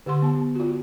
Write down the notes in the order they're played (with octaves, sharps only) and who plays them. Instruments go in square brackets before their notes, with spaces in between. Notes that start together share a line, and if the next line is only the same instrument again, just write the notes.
[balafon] D3 G4 F#5 C6
B3 A5
F4 F#4